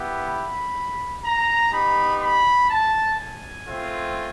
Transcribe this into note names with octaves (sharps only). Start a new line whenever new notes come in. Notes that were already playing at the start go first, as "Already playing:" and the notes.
Already playing: B3 E4 G4
B5
A#5
B3 D#4 G4 B5
B5
A5
G#5
A3 C4 F4